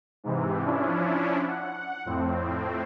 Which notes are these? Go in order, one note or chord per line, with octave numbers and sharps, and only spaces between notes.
G#2 C3 E3
F3 C#4 D4 E4
F#5
F2 A2 C4